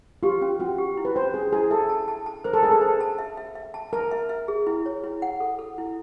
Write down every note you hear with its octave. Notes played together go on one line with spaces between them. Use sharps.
F4 G4
C#4
C#4 F#4
G4
E4
B4
C#4 C5
C#4 G#4
E4 G#4
A4 E5
A5
A5
A5
A#4 C5
A4
G#4 E5
A4
C5
A5
E5
E5
E5
A5
A#4 A5
E5
E5
G#4
E4
C#5
E4
F#5
A4
A4
E4